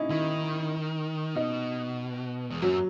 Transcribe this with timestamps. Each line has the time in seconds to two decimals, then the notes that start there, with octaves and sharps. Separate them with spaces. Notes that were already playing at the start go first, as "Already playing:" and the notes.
Already playing: C#4 D#4 E4
0.10 D#3 E4
1.35 B2 D#4
2.50 E2
2.62 F#2 F#3